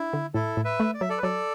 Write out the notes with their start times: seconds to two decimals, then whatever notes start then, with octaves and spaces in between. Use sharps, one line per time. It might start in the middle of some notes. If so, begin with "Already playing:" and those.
Already playing: D4 E4
0.13 D3
0.34 A2 E4 A4
0.57 A2
0.65 B4 E5
0.80 A3
0.94 D5
1.01 F#3 E5
1.09 A4 D5
1.18 B4
1.23 F#3 A4 D5